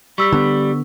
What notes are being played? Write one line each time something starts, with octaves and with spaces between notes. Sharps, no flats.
G3 C#6 E6 B6
D3 B3